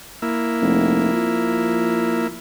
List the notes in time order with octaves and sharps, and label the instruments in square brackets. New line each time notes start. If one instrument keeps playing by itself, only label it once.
[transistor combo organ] A#3 E4
[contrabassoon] F1
F3